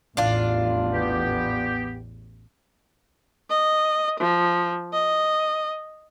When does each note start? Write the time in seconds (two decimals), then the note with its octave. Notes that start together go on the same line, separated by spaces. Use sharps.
0.17 A1 E2 D4 F4
0.92 B3 G4
3.50 D#5
4.20 F3
4.93 D#5